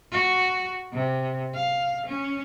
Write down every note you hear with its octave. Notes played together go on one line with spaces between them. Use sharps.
F#4
C3
F5
C#4